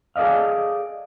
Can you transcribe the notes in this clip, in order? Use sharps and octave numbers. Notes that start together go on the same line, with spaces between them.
G#4 A4 D5 D#5 F5